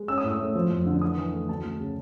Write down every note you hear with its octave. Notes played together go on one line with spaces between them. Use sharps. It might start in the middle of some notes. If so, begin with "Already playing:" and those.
Already playing: G#3
C#4 E6
D#6
A2 E6
A3
F3
F2
D3
E3 D#6
E3
A3
D2 A5
D2
C#3